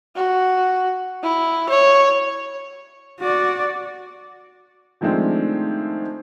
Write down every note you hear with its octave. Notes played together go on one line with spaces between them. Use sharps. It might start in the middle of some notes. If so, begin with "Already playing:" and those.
F#4
E4
C#5
F#4 D5
D#3 F3 G#3 A3 C4 D4